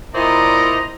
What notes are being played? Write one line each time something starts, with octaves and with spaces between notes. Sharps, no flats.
A#2 E4 C5 D5 D#5 A#5